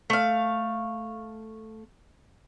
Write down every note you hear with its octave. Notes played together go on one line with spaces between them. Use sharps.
A3 F5